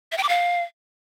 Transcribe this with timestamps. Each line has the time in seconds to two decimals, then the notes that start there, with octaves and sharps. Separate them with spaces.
0.12 E5
0.18 G5
0.23 D6
0.29 F5